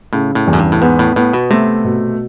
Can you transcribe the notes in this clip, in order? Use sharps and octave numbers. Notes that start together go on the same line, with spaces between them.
A2 C#3
A2
E2
F#2
G2
A2
G#2 B3
A2
A2 B3
B2
C3 A3
B2